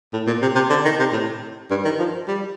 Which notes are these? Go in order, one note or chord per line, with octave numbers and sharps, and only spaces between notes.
A2
A#2
C3
C3
D3
D#3
C3
A2
G2
D#3
F3
G3